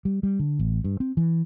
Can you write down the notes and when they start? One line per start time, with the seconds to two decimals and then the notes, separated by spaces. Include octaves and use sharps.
0.05 G3
0.23 G3
0.39 D3
0.59 A1
0.84 G2
1.00 C4
1.17 E3